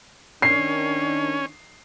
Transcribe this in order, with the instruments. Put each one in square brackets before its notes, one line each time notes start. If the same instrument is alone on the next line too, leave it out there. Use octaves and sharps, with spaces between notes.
[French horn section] D#3 D4 [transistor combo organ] C#4 [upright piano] C7